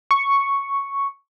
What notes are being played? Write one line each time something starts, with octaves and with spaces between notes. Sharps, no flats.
C#6